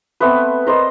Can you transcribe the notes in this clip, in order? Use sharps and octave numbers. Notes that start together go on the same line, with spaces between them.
A3 B3 C4 B4
A#4 C5 D5 D#5